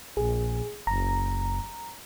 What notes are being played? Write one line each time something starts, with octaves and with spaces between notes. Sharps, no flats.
A#1 G#4
F#1 A#5